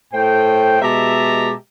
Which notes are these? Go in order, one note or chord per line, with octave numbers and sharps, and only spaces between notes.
A2 A3 C5 G5
B2 G#3 G4 E5 A5 A#5